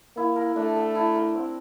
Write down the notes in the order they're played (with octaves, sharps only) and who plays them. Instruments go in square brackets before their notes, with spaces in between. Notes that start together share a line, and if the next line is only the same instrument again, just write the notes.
[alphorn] A#3 [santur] E4
[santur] A#4
[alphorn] A3 [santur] D4
[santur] A4
E4
A#4
C4